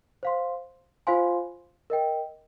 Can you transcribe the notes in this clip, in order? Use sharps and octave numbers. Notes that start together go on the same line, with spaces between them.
C5 F5 C6
F4 C5 F5 G#5 C6
A#4 D#5 G5